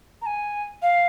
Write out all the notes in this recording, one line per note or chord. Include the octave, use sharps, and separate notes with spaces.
A#5
G#5
F5